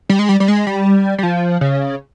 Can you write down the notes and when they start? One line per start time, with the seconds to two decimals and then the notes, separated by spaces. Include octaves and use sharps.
0.09 G3
0.19 G#3
0.29 G3
0.40 G3
0.48 G#3
0.67 G3
1.18 G3
1.23 F3
1.61 C#3